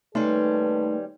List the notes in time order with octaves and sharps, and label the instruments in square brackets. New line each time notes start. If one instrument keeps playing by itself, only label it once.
[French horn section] D#2 A4 B4 [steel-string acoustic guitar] G3 C#4 [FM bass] A3 [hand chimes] D#4 C6